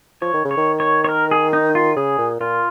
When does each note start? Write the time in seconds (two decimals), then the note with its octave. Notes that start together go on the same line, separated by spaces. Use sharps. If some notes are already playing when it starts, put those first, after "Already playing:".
0.22 F3 C#5
0.34 D#3
0.45 C#3
0.51 C#5
0.57 D#3
0.80 C#5
1.04 C#5
1.09 A#4
1.31 G#4
1.53 D#4
1.75 F4
1.96 C#3 G#4
2.18 A#2
2.40 A#2 F4